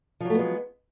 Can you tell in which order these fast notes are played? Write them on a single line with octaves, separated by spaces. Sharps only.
F3 F#3 A3 B3 G#3